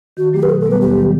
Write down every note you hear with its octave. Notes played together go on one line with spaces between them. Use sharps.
D#3 F#4
F#3 A3 G4
B4
B2 A4
A4
G3 B3 B4
D#2 G4
D#3 F#3